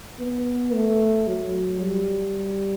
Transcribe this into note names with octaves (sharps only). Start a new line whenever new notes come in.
B3
A3
F#3
G3